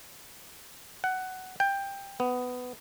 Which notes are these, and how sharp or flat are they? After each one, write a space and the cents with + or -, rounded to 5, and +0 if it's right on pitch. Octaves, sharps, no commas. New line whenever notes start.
F#5 +15
G5 +15
B3 +15